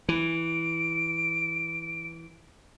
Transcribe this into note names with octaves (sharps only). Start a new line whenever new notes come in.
E3 D7